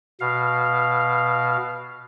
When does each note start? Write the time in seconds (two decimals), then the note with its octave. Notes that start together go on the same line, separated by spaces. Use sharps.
0.20 B2 F5